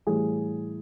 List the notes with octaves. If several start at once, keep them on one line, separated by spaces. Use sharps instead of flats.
A2 E3 G3 G#4